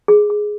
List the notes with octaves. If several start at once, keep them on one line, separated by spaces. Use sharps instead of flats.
G#4
G#4